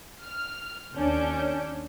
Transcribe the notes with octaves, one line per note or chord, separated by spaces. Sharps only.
F6
D#2 C#4 D4 G6